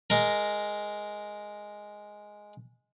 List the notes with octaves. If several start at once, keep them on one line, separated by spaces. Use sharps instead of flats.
G#3 A#4